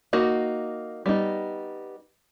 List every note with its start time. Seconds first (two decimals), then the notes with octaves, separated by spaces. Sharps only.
0.13 A#3 D#4 F#4
1.06 G3 B3 D#4